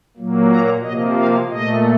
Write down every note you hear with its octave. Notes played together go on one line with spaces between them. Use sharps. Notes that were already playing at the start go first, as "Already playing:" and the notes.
A#2 F#3 A#3
A#5
C3 F3 A#3 D#5
F5
A#2 A3 D#5